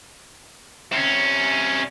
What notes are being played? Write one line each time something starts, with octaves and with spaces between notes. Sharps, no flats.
C3 C#4